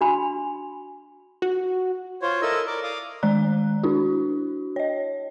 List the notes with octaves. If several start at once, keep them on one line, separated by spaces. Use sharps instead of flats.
D4 F#4 G#5 B5 C6
F#4
F4 C5 C#5
E4 A4 A#4 D#5 E6
A#4 D5 D6
D5 F5 D6 D#6
D#3 G#3 D5 A#5 F#6
D4 E4 F#4
C#5 D#5